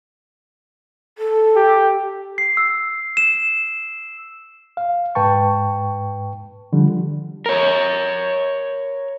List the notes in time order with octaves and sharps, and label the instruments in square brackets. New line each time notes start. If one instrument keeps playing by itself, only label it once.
[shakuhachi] A4
[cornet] G4
[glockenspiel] C7
E6
E7
[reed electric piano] F5
G#2 B4 G5 A5 C#6
D3 F3 G3
[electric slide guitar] A#4 C#5